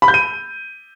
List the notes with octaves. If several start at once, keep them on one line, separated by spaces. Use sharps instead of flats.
B5
G6
D#7